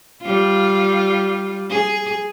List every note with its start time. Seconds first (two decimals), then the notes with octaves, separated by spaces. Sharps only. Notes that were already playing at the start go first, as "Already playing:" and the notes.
0.22 G3 F4
1.70 G#4